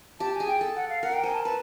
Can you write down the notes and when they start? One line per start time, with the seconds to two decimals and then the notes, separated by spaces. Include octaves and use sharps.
0.19 G4 A5
0.34 G#5
0.40 G#4
0.47 G5
0.61 A4
0.76 F#5
0.89 F5
1.03 A#4 F#5
1.13 G5
1.23 C5 G#5
1.34 A5
1.45 B4 A5